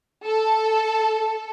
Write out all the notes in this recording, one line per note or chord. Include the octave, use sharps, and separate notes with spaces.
A4